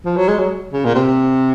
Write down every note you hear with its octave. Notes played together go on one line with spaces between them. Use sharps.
F3
F#3
G#3
F#3
C#3
A#2
C3